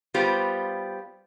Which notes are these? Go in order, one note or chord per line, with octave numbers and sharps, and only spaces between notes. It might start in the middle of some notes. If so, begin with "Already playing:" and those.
G3 B3 F4 G4 C5